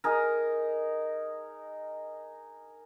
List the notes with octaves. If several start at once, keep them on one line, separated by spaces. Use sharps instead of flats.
D#4 G#4 A#4